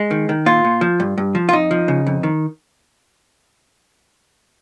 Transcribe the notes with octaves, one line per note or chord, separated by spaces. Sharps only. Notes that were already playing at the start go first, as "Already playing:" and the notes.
Already playing: G#3
D#3
D#3
A#2 F4
A#2
F3
G2
G2
F3
F4
F2 D#4
F3
C#3
F2
D#3